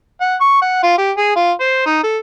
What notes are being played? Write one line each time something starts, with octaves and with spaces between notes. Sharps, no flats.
F#5
C#6
F#5
F4
G4
G#4
F4
C5
D#4
A4